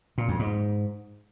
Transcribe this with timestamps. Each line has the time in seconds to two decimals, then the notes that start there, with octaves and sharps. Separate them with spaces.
0.18 A#2
0.28 F2
0.39 G#2